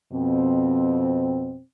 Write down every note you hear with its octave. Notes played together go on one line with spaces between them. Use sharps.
F2 B2 C4